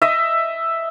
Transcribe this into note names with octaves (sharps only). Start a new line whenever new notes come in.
D#5 E5